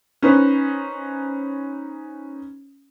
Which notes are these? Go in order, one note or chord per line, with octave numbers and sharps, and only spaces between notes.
C#4 D#4 B4 C5